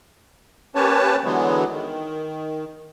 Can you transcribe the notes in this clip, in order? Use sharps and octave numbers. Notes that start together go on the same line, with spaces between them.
A#3 C#4 G4 B4 C#5 A5
D3 E3 F#3 G#3 B3
D#3